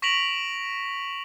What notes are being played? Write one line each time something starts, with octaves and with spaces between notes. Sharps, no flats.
C#6 A#6 B6 D7 F7 F#7